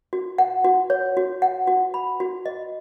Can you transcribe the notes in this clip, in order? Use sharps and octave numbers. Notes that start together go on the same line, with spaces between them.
F#4
F#5
F#4
C#5
F#4
F#5
F#4
B5
F#4
D#5